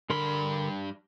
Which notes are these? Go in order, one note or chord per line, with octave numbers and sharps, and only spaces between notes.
G2 D3 A#4 B5 C6